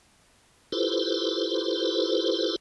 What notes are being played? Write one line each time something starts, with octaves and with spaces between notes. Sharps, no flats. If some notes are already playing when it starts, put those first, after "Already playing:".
E4 F4 G4 A4 B4 C5